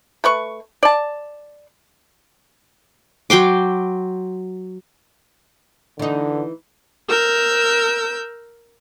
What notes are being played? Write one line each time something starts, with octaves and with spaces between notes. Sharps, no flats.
A3 B4 C#6
D5 A5
F#3 G5 C6 D6
D3 E3 D#4
A#4 E6 G6